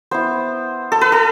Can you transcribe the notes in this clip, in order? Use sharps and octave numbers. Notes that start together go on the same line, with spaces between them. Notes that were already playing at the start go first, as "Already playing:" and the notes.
B3 E4 C5
A4
B4
A4